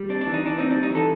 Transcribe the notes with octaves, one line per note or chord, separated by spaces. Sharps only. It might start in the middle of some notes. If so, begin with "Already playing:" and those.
Already playing: G3
C4 D4
E3 D4
D#4
E3 D4
C4 D#4
G3 D4
D#4
E3 A4